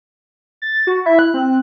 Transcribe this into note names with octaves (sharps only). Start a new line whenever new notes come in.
A6
F#4
E4 E5
F#6
C4